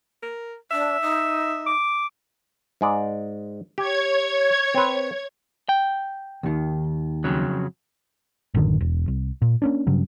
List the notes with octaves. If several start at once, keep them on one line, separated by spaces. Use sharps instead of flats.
A#4
D4 E5
D#4
D6
G#2 G#3 D5
G4 C#5 G#6
C4 B4
G5
D#2 D#3
F2 C#3 F#3
A1 F#2 D3 D#3
E1
C2
A#2
A#3 C#4 D4
G2 C#3 F#3